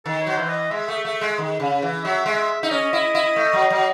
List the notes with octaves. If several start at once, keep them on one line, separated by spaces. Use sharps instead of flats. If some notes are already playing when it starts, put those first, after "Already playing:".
D#3 A4
C#5
F#3 C5
E3
D#5
G#3 E5
A3
A3
G#3
D#3
C#3
E3
F#3 E5
G#3
D#4 E5
C#4 D#5
E4
E4
A3
F#3
F#3